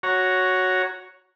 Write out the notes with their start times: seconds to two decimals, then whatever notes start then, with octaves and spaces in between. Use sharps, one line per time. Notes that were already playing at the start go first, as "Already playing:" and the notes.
0.03 F#4 C#5 A#5